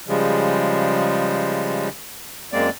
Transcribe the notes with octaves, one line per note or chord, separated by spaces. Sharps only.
C#3 F3 G3 G#3
F#2 G#3 A#3 C4 D5